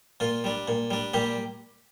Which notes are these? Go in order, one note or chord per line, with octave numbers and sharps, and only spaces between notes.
A#2 F4
G3 D4
A#2
G3 D4
A#2 G3 G4